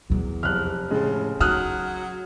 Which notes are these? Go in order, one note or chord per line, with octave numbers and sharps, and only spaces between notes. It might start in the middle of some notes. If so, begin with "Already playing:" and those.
E2 D#3 F#3
F1 F6 F#6
A2 C#3 G#3
F#3 D#4 D#6 F6 F#6